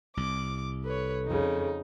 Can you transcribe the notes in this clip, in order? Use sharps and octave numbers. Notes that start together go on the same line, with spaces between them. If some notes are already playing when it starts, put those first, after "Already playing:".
C2 D6
A4 B4 C#5
F2 C#3 D#4